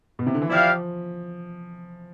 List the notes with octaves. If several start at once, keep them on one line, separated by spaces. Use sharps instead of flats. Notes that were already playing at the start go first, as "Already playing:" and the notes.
B2
C3
D3
E3
F3 E4 G4 D5 F5